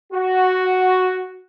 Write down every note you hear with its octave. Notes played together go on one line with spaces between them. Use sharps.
F#4